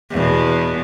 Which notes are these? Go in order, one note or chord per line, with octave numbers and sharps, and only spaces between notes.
E2 B2